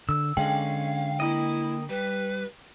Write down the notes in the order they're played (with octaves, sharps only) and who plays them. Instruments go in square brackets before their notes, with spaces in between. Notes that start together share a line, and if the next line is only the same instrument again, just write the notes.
[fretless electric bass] D3 [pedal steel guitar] E6
[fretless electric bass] D3 G#3 [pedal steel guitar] C#4 [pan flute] F5 [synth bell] G5
[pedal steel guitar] A#3 D#5 [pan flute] E4
[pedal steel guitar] G3 [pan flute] B4